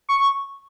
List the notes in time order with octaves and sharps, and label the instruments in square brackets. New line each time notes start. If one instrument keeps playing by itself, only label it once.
[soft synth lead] C#6